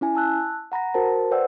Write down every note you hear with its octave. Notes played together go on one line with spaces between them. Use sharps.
C#4 E4 G#5
A5 E6 F#6
F#5 A#5 B5 A#6
F#4 A#4 C5 A5
B4 C5 D5 F#5 G5 E6